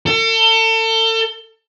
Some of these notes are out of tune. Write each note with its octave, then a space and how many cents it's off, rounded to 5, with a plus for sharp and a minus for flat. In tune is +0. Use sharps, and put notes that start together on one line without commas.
A4 +35